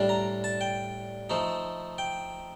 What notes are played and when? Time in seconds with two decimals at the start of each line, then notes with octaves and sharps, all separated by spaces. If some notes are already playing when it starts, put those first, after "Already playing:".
Already playing: A2 G3 D4
0.09 A#5
0.44 A5
0.61 G5
1.30 F3 A3 D#4
1.98 G5